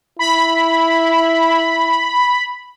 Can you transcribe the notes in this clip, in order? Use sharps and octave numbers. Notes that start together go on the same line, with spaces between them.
E4 B5